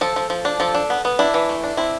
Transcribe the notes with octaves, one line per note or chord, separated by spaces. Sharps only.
F3 A4
F3
F3
D4
F3 A4
D4
B3
B3
D4 E4
E3
A3
D4
C4 E4